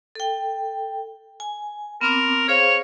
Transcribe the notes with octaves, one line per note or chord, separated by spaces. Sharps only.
A4 G5
G#5
B3 C4 A#4 D6
G#4 C5 C#5 F5